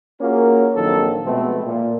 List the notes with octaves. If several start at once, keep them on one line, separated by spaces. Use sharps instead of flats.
A#3 C#4 F4 F#4 G#4 A#4
A#1 D#3 F#3 A#3 C4 A4
B2 F3 G#3 A3 B3 C4
A#2